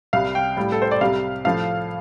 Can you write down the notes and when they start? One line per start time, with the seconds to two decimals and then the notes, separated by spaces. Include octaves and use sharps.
0.13 C2 C3 G3 F5
0.35 G5
0.57 A2 G3
0.72 A4
0.82 C5
0.91 D5
1.01 C2 C3 G3 F5
1.45 A2 F3 A3 F5